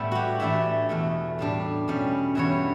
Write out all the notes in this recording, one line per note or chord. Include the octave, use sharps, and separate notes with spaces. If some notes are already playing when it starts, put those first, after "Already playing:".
Already playing: A2 G3 B3 E4
F#4 G4
A2 E3 A3 D4 E5
E2 B2 A3
A2 G3 D4
B2 G3 C#4
G2 E3 B3 C#5